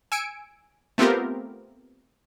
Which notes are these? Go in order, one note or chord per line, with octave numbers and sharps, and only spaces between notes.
G#5 E6 C#7 D7
A3 B3 C4 F4 G4 A#4